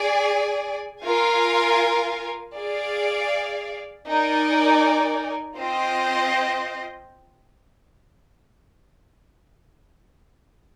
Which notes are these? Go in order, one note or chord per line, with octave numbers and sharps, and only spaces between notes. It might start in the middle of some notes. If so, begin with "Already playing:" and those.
Already playing: G#4 D5 G#5
F4 A#4 F5 G#5
G#4 D5 F5
D#4 A#4 D5 G#5
C4 F4 C5 D#5